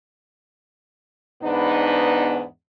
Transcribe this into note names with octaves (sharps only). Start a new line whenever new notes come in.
E2 G#2 B3 D4 D#4 B4